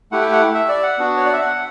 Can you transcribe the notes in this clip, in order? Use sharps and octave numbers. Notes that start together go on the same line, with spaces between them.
A3 E4 G4 F#5
G5
F#5
E5
D5
F#5
B3 D4 F#4
C#5
D5
E5
F#5